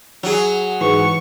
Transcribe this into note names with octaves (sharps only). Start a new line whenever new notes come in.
F#3 G#4
G#2 E3 C#6